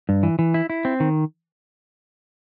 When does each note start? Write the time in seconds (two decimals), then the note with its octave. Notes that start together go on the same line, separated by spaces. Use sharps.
0.09 G2
0.23 E3
0.39 E3
0.54 E4
0.70 E4
0.85 C4
1.00 D#3